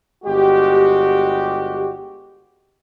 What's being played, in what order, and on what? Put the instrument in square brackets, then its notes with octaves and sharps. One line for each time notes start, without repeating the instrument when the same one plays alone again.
[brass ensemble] G1 G#3 F#4 G4